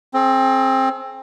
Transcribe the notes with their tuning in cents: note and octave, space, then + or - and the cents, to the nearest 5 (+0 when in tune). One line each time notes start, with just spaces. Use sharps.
C4 +20 G#4 +45